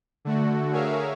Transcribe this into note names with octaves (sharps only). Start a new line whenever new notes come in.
D3 A3 F#4
G#4 A#4 C#5 E5 F5